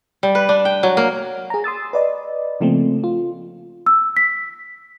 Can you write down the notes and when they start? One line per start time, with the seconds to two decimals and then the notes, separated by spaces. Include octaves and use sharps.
0.23 G3
0.35 B4
0.49 D4
0.65 G5
0.83 F#3
0.97 A#3
1.50 G#4 A#5
1.64 C6 D#6 E6 A6
1.93 B4 D5 D#5
2.61 C#3 F3 A3 A#3 C4
3.04 F4
3.86 E6
4.17 B6